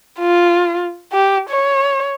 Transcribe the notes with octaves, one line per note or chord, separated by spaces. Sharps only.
F4
G4
C#5